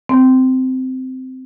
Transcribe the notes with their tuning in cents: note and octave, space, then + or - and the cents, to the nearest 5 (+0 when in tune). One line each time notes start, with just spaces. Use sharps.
C4 -15